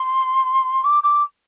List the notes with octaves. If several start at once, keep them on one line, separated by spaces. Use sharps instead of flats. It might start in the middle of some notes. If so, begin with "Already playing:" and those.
Already playing: C6
D6
D6